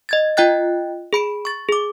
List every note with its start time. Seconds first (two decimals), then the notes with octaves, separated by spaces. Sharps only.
0.09 D#5 G#6 A6
0.37 F4 D#5 G5 F#6 A6
1.13 G#4 B5 D7
1.45 C#6 A6
1.69 G#4 D6